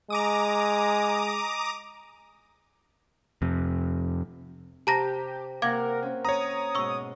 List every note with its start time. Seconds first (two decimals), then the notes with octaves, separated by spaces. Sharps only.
0.10 G#3 A#5 D6 D#6
3.42 F2 C3
4.87 C3 G4 A5 A#5 A#6
5.62 C3 A#3 A#4 F5 F#5 D6 G#6
6.03 C4 C#4
6.25 C#5 A#5 D#6
6.75 G#2 B2 C#6 E6